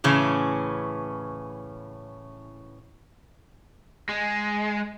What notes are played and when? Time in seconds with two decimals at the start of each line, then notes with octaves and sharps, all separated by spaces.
0.04 A2 C#3 E3 C#4
4.09 G#3